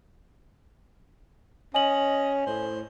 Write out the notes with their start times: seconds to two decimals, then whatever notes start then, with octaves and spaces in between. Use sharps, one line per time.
1.74 C#4 D#5 G#5 F#7
2.46 A2 C5